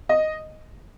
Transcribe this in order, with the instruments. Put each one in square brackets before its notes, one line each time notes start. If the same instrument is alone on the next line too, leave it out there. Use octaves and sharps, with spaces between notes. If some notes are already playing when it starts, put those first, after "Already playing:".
[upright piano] D#5